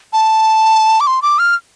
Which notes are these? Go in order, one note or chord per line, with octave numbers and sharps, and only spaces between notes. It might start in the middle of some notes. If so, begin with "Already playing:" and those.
A5
D6
C6
D6
F6